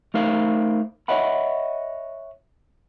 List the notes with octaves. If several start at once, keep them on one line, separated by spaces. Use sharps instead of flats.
A3 D#4 A#4 C5 F5
C#5 D#5 E5 F#5 B5